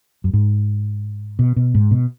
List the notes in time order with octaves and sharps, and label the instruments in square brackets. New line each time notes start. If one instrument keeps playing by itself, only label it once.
[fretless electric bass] F#2
G#2
B2
B2
G#2
B2